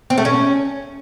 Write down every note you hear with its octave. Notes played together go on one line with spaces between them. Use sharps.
C4
A3
C#4